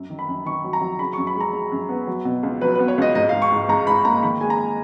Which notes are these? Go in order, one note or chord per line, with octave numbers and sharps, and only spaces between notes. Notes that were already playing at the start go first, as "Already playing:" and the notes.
Already playing: F#2
D#3
B5
F#2
D#3 C#6
F#3
A#5
F#3
C#3 B5
C#6
F#2
B5
G#3
A#5
G#3
F#2
B3
F#3
B2
C#2
F#3 B4
B4
B3
C#5
C#2 D#5
G#2 D#5
F5
G#2
C#6
G#2
G#2 A#5
G#2 B5
A#3 A#5
D#3 B5
G#3 G#5
A#5